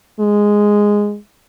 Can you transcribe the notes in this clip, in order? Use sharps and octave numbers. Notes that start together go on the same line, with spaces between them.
G#3